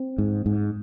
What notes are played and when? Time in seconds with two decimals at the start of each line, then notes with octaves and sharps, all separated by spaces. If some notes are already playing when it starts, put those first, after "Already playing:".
Already playing: C4
0.18 G#2
0.46 G#2